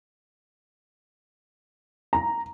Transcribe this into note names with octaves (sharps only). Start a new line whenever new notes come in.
A#5